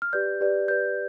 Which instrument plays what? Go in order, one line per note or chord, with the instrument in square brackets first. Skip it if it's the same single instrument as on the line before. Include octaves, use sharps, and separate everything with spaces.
[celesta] F6
G4 B4 D5 G6
G4 B4 D5
G4 B4 D5 G6